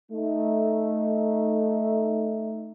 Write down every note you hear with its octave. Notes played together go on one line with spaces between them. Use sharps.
A3 D#4